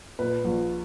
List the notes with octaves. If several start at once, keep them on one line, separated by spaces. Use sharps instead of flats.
A#2 B4
A#1